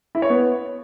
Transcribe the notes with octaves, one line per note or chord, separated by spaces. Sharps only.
E4
C#5
B3